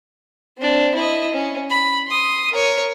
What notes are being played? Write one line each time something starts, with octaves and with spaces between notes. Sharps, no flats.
C4 D4
E4 D#5
C#4
B5
C6 D#6
A#4 C#5